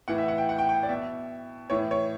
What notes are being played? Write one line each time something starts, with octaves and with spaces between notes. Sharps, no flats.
A2 E3 F#5
E5
F#5
G5
F#5
G5
G5
D5
B2 E5
A2 E3 C#5
C#5